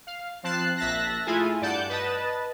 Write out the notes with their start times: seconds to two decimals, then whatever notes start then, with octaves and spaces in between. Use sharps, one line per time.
0.07 F5
0.43 F3 C4 A5 F#6 C7
0.78 A#1 E5 A5 F#6 A#6
1.26 A3 E4 F4 G#4 A4 G#5
1.61 G2 D5 F#5 A5 G6
1.89 B4 D#5 A5